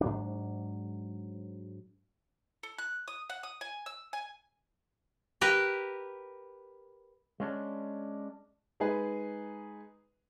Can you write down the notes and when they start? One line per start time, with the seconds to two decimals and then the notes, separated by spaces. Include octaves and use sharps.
0.01 G#2 F#3 D4
2.63 A4
2.78 F#6
3.08 D#6
3.29 F#5
3.43 D#6
3.61 G#5
3.86 E6
4.13 G#5
5.41 G4 A#4 B4
7.40 G#3 C#4 D4
8.80 G#3 D#4 G#4 B4